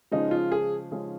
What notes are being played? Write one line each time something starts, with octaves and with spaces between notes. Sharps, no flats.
C#3 F3 G#3 C#4 D#4 G#4
F4
G#4
C#3 F3 G#3 C#4 G#4